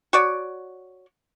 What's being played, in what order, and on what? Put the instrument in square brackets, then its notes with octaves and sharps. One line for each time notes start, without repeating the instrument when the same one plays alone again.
[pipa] F#4 C#5 D5